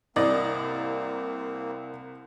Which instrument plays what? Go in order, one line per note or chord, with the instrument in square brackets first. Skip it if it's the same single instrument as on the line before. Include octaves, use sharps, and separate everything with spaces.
[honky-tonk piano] C2 [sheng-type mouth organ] A#3 C4 [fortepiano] E4 D5 D#5